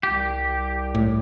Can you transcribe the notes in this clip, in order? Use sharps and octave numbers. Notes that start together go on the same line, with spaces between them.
C2 G4
A2